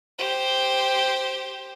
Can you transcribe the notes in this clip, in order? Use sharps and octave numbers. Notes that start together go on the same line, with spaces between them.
G4 C5